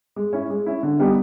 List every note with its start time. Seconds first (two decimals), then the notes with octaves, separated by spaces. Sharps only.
0.16 G#3
0.33 C#4 E4
0.50 G#3
0.66 C#4 E4
0.83 D3
0.99 G3 B3 D#4 G4